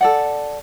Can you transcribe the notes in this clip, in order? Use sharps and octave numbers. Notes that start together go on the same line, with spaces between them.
A4 D5 F#5